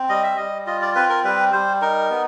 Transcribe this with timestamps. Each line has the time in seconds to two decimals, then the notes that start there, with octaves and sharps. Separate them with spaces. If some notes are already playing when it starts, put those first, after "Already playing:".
Already playing: C4
0.09 G3 D#5
0.23 E5
0.37 G3 D#5
0.66 F4 D#5
0.82 D5
0.95 C4 B4
1.09 A#4
1.24 G3 B4
1.53 G3 C5
1.82 D#4 A#4
2.10 B3